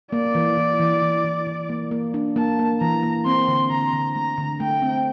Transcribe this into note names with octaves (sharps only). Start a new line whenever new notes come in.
A#3 D5
E3
E3
E3
E3
E3
E3
A#3
A#3
D4
A#3 A5
A#3
E3 A#5
A#3
C4 C6
D3
D3 A#5
D3
A3 A#5
D3
A3 G5
C4